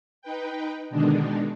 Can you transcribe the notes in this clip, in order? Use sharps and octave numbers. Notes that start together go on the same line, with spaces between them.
D#4 B4 G5
B2 D3 D#3 G#3 D4 D#4